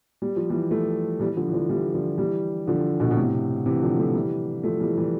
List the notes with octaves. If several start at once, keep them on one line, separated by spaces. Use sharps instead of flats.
G3
F3
E3 G3
F3 A3
E3 G3
D3 F3
E3
D3 F3
E3 G3
D3 F3
E3 G3
D3 F3
B2 D3
B2
A2 C3
C3 E3
D3 F3
F3 A3
E3 G3
F3 A3
E3 G3
E3 G3